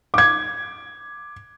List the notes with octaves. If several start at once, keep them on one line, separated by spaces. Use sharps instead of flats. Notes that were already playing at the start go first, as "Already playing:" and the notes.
D6 G#6